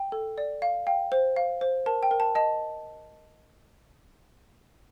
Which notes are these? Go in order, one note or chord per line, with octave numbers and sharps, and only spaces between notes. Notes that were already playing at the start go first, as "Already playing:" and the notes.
Already playing: G5
A4
D5
F5
F5 G5
C5
F5
C5
A#4 A5
G5
A#4
A5
D#5 A5